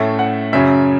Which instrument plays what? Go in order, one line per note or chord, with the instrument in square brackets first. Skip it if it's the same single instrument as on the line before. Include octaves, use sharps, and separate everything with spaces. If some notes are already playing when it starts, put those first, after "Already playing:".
Already playing: [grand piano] A2 A3 C#4 E5
F#5
F#2 C#3 F#3 C#4 E5